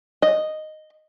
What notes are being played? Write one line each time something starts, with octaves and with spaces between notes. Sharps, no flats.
D#5